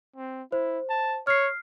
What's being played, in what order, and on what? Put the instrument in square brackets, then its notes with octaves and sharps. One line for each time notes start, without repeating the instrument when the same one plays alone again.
[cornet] C4
[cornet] E4 [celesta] C5
[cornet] A5
[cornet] C#5 [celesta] F6 C7